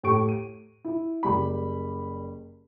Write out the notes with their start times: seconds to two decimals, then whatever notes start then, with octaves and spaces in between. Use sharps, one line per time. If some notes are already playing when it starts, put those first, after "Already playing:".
0.03 A2 G4 C#6 D7
0.29 D#7
0.85 E4
1.23 F#1 G3 G4 B5